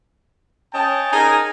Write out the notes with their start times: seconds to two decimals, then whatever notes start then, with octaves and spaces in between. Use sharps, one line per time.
0.74 C#4 D#5 G5 A5
1.12 D#4 G#4 A#4 G#5